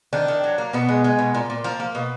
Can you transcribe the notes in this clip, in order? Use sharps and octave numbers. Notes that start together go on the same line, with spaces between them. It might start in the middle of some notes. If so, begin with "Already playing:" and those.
D#3 D4
D#3
F#3
A#3
B2 B3
G#3
G#3
B2
A#2
A#2
F3 A#3
A#3
B2